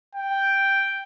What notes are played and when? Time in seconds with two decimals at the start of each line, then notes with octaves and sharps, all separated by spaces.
0.15 G5